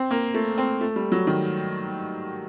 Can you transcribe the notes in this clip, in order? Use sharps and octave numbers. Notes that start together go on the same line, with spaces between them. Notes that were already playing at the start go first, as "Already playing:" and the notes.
Already playing: C4
A#3
A3
C4
A3
G3
F#3
D#3